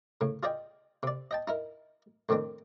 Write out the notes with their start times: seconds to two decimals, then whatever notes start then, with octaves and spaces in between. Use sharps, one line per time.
0.21 A2 C#3
0.43 F4 G#4 D5 D#5 G5
1.03 C3 D5
1.31 D#5 G5 A5
1.48 D#4 E4 A#4
2.29 F2 A2 D#3 C4 D4